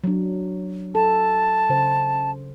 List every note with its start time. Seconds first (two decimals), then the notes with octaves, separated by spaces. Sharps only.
0.04 F#3 D4
0.95 A4 A5
1.69 C#3 C5